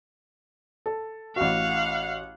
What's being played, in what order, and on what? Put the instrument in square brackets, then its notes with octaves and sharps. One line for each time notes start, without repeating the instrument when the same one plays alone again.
[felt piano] A4
[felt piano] A1 F#4 [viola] F5 F#5